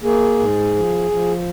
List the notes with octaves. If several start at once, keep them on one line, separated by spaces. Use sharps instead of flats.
A#3 G#4
G#2
F3
F3